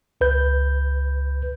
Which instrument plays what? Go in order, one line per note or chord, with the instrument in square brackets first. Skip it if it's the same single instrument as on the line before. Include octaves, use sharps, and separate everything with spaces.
[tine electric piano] C#2 B4 G6